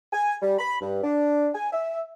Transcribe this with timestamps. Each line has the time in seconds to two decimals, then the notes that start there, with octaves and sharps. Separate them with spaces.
0.13 G#5
0.42 G3
0.59 B5
0.81 G2
1.03 D4
1.55 G#5
1.73 E5